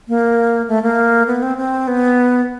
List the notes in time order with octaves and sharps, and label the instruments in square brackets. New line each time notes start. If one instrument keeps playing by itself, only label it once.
[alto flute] A#3
A3
A#3
B3
C4
C4
B3